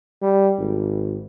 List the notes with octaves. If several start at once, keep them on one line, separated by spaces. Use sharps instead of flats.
G3
G#1